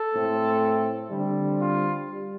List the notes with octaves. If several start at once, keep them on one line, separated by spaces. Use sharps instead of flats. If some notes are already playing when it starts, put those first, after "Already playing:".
Already playing: A4
A2 A3 C4
D3 G3 C4
F4
G3